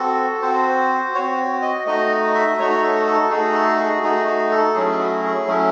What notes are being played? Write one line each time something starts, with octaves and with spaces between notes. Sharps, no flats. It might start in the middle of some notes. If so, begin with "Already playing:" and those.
Already playing: C4 F#4 A4
C4 F#4 C5
C4 F#4 C#5
D#5
A3 D#4 F#4 D#5
E5
A3 D#4 F#4 C#5
A4
A4
A3 D#4 F#4 G#4
A4
G#4
A3 D#4 F#4 G#4
F#4
A4
F#3 A3 C#4 E4 G#4
F#4
G#4
F#3 A3 C#4 E4